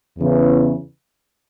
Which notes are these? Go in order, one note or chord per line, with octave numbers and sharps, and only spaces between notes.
E2 C#3 E3